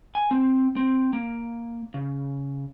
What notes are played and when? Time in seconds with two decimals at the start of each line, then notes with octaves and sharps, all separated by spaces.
0.15 G#5
0.31 C4
0.76 C4
1.13 A#3
1.94 C#3